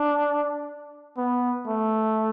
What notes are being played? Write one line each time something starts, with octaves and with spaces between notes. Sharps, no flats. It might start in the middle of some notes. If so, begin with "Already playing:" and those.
Already playing: D4
B3
A3